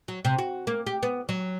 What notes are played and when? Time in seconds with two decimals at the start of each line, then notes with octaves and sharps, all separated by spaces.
0.08 F#3
0.25 C3
0.38 F#4
0.67 A#3
0.87 G4
1.03 B3
1.29 F#3